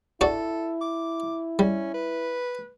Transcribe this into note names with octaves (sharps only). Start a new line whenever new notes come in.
D4 E4 F#4 A4 D5
D6
G3 C#4
B4